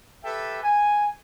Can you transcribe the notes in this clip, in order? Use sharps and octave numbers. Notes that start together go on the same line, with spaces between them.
G4 A4 B4 E5 G5
G#5